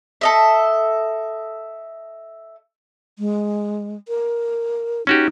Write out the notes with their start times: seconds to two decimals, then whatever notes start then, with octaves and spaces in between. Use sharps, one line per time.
0.21 A4 D#5 E5
3.19 G#3
4.08 A#4
5.07 C#4 D#4 F#4 G4